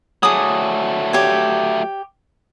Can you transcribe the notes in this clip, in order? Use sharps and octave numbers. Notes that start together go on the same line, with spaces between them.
F#3 A3 G#4 D6 D#6
G4 C#5